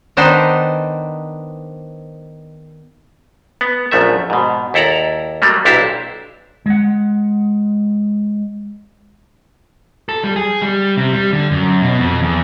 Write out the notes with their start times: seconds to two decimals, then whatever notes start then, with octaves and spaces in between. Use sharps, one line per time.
0.17 D#3 B3 D4 D#4 C5
3.61 B3
3.91 A#1 F#2 F3 A3 E5
4.30 G#2 B2
4.74 D#2 E4 A4 D5 A#5
5.42 F#3 G3 A3 A#3
5.65 B1 A#2 D4 E4 G4 C5
6.66 G#3 F#5
10.09 A4
10.24 G3
10.36 G#4
10.62 G3
10.97 C3
11.13 G3
11.33 D3
11.51 F#2
11.82 B2
11.98 F2
12.22 E2